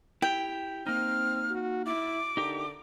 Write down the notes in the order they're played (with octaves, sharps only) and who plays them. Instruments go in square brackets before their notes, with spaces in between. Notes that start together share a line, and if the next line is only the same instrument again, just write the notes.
[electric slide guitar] E4 G4 [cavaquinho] G5
[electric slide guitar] A#3 D#4 [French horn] C4 [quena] F6
[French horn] F#4
[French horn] E4 [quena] D6
[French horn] D3 [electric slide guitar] D#4 G4 A#4